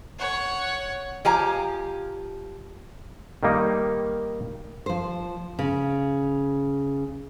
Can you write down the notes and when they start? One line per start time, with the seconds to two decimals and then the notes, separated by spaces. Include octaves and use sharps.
0.19 C#5 F#5
1.25 F3 G4 G#5 A#5
3.43 D#3 G3 A#3 D#4
4.86 F3 C5
5.59 C#3